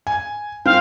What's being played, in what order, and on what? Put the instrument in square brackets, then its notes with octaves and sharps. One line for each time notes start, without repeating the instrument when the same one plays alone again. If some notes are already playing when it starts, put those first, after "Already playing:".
[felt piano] G#5
[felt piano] C4 [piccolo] F5